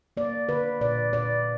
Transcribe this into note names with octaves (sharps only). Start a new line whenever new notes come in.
A#3 D5
D3 B4
A#2 D5
A#2 D5